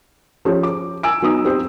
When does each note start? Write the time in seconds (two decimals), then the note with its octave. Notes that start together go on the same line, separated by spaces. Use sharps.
0.45 F3 C#4 G4 G#4
0.63 D6
1.03 G#5 E6 D7
1.22 F#3 B3 D#4 D#6
1.45 C4 G4 C5